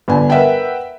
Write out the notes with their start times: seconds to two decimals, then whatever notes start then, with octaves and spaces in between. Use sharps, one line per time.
0.08 G1 D3 G#5
0.30 A#4 B4 E5 F#5 G5